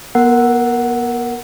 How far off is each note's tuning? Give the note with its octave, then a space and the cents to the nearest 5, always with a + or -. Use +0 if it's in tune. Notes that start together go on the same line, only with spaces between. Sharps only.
B3 -40 A#4 +0 F#5 +0